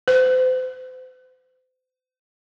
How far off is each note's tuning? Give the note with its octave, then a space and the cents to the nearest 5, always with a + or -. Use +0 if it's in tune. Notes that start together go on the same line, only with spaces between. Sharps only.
C5 -40